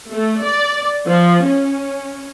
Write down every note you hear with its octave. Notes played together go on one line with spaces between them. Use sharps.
A3
D5
F3
C#4